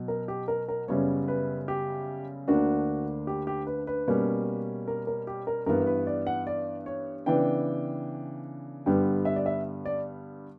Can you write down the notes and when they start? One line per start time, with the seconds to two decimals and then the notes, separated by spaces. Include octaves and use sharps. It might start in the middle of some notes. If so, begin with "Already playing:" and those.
Already playing: B2 F#3
0.08 A#4
0.28 G4
0.48 A#4
0.68 A#4
0.88 F#2 C#3 G3 B3 C#5
1.28 B4
1.68 G4
2.48 D2 D3 A#3 D4 F#4
3.27 G4
3.47 G4
3.67 B4
3.87 B4
4.08 B2 G3 A#3 C#4
4.88 A#4
5.07 A#4
5.27 G4
5.47 A#4
5.66 G2 E3 B3 A#4
5.87 B4
6.07 D5
6.27 F#5
6.47 D5
6.86 C#5
7.26 C#3 E3 B3 D4 G5
8.86 G2 D3 G3 B3 G5
9.25 E5
9.36 D5
9.46 E5
9.86 D5